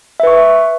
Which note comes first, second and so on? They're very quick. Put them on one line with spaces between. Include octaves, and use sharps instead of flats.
E5 B4 C#6